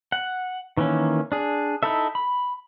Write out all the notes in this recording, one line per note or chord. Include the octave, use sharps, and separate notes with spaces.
F#5
D#3 E3 A#3 C#4
D4 G#4
D#4 E4 A4 E5
B5